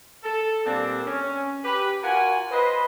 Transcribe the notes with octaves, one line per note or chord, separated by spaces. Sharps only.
A4
A#2 G3 A#3 C4 D4
C#4
G4 B4
F4 F#4 A#4 F#5 G#5
B4 C5 D#5